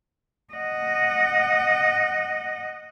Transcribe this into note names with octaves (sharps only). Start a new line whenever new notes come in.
D#5 F#5